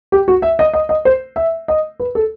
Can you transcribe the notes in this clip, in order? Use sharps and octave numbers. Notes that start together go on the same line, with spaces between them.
G4
F#4
E5
D#5
D#5
D#5
C5
E5
D#5
B4
A4